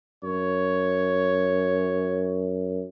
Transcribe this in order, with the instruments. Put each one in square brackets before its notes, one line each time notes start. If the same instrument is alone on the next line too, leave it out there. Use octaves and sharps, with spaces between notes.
[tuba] F#2 [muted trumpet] C#5